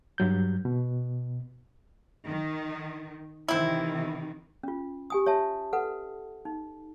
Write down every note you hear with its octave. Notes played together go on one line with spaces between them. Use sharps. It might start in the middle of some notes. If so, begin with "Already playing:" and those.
G2 F#3 G6
B2
D#3
C3 D#3 E3 C4 E4
C#4 F4
G4 G#5 D#6
C#5 E5 A5
A4 B4 F#5
D#4